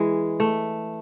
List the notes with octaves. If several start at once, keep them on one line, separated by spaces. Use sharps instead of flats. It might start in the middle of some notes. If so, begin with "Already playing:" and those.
Already playing: E3 G#3
A3